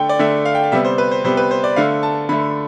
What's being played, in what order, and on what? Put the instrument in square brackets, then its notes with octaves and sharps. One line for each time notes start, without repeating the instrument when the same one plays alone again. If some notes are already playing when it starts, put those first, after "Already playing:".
Already playing: [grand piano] D3 A3 G5
D5
D3 A3 E5
F5
G5
F5
C3 G3 B3 E5
C5
B4
C5
C3 G3 B3 C5
B4
C5
D5
D3 A3 F5
A5
D3 B5
A3